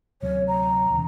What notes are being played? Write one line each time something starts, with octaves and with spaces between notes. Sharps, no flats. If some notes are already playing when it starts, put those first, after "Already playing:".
D2 C3 F#3 C#5
A#5
E1 E2 C#3